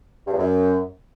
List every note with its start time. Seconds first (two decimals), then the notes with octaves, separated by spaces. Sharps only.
0.27 G2
0.33 E2
0.38 F#2